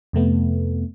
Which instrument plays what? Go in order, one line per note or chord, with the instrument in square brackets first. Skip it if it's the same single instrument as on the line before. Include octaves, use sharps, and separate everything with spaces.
[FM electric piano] F2 C3 A3 B3